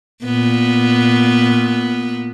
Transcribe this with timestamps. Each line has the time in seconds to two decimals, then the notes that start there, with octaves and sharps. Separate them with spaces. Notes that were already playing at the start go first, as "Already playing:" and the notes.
0.24 A#2 B3